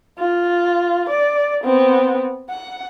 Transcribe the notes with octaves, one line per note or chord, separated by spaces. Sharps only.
F4
D5
B3 C4
F#5